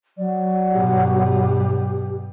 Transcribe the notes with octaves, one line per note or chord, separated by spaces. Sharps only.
F#3 D5
G2 B2 G4